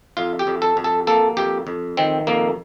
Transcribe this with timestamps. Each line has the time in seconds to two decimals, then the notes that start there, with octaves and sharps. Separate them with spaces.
0.17 F2 F4
0.39 G4
0.47 F2
0.62 A4
0.77 F2
0.84 A4
1.07 A#3 A4
1.37 F2 G4
1.67 F2
1.97 D#3 C4
2.27 F2 A#3